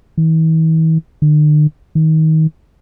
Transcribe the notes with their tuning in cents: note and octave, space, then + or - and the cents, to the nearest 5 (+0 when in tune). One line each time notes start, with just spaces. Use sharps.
E3 -45
D3 +45
D#3 +25